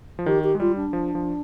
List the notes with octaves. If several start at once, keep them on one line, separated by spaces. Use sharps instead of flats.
F3
D#3 G4
G4
G#3
G3 F4
D4
F3
F3